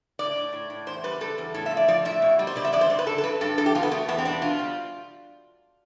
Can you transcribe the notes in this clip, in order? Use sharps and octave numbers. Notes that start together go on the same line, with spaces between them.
A2 D5
A2
A2
A2
E2 C5
G3 B4
G3 A4
E2
A2 A4
E5
F3
D5
F3 D5
A2 E5
B2
G3
C5
B2 D5
E5
E2 D5
C5
G2 D5
B4
D3 A4
A4
G2 B4
G2 A4
E2 A4
G4
B2 F4
B3
B2 A3
E2 B3
C4
G3 D4
B2 F4
G3